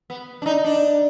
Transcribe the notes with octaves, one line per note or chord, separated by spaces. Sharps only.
B3
D4
D#4
D4